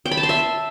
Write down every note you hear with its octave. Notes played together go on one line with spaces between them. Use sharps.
G5
B5
A5
C6
E5